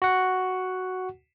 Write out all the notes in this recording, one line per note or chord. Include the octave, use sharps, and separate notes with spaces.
F#4 F#5